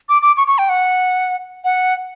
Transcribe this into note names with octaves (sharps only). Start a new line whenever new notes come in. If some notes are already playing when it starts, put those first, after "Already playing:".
D6
D6
C#6
C#6
G5
F#5
F#5